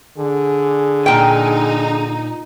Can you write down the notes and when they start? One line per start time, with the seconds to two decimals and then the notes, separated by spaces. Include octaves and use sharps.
0.18 D3 G#4
1.06 A#2 D#4 G5